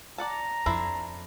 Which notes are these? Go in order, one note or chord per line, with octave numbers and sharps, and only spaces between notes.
D5 F#5 A5 A#5
F2 D4 E4 C5